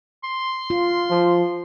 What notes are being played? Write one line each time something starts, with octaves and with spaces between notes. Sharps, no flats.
C6
F4
F3